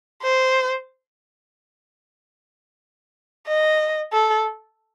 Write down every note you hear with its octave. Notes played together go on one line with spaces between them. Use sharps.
C5
D#5
A4